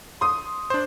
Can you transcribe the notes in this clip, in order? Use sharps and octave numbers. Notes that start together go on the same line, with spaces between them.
C6 D#6
D4 C5